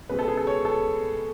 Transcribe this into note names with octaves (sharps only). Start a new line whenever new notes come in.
C#2 B2 G#3 B4
A4
G#4
A4
C#5
A4